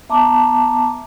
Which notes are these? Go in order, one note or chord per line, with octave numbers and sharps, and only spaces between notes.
B3 E5 A5 A#5 D6